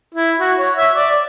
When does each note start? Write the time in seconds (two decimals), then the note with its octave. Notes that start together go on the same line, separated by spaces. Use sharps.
0.15 E4
0.40 F#4
0.58 C#5
0.77 E5
0.96 D5